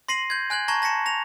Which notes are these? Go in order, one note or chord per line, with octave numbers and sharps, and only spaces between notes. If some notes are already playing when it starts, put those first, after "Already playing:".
C6 A#6 C7 D#7 F#7
G6 G#6
G#5 F#6 G#6 F#7
A5 A#5 C#6 G#6 A#6
A5 A#6 B6 C#7 E7
A#6 F7